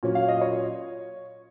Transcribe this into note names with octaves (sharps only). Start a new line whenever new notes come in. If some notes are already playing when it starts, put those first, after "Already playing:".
A#2 F#3 C#4
F5
D#5
C#5